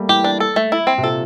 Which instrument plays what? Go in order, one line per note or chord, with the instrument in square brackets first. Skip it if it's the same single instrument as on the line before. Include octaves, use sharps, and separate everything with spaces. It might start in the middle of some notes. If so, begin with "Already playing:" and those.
Already playing: [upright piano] G3 A3 A#3
[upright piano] E3 [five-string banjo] G4
[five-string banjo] D4
A4
A3
E4
C4
[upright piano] C3
[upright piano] A#2 [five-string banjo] A4